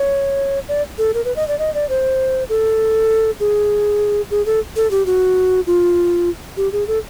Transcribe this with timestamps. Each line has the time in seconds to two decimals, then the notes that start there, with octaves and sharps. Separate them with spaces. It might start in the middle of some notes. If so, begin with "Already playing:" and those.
Already playing: C#5
0.69 D5
0.98 A4
1.14 A#4
1.25 B4
1.36 D#5
1.48 D5
1.59 D#5
1.74 D5
1.89 C5
2.49 A4
3.40 G#4
4.31 G#4
4.46 A4
4.76 A4
4.91 G4
5.06 F#4
5.67 F4
6.57 G4
6.72 G#4
6.87 A4